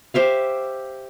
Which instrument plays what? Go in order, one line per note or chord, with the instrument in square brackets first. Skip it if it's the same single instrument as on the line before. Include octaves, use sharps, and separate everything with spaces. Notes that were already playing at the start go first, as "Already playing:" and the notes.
[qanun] G4 C5 E5 F5